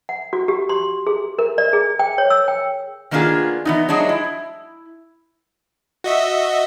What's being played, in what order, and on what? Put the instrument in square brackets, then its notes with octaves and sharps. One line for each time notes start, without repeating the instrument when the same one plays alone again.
[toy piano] F#5
F#4
G4
C6
G#4
A#4
D5
G#4
G5
C#5
E6
G5
[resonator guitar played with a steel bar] D#3 A#3 B3 D4 F4 G#4
E3 B3 D#4
F#3 G#3 D4 D#4 F#4 G#4
E4
[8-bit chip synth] F#4 D#5 E5